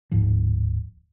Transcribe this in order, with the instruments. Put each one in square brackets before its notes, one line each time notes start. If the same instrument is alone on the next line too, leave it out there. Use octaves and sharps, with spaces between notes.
[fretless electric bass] D1 G#2 F3